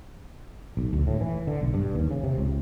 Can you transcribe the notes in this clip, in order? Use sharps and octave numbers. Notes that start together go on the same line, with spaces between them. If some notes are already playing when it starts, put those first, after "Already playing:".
B1
D2
A2
E3
D3
B1
G2
D#2
C#3
C3
C#2